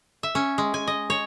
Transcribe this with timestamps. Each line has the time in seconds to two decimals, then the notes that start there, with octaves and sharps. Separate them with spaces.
0.23 E5
0.35 C#4
0.58 G#3
0.74 G#5
0.87 D#5
1.10 C#5